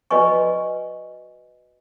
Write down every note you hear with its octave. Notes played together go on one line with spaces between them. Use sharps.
F#4 B4 D5 D#5 G#5 C#6